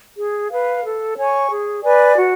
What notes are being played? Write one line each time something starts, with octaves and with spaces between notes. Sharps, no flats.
G#4
B4 F5
A4
C#5 G#5 C#6
G#4
B4 D5 G#5
F#4